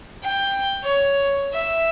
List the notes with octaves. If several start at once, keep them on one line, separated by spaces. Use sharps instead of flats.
G5
C#5
E5